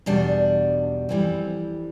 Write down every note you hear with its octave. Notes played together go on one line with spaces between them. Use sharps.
E2 B2 G3 D4
F2 E3 G3 C4